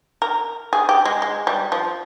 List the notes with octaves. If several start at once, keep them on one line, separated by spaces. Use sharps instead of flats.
A#4
G#4
G4
G#3
G#3
G3
F3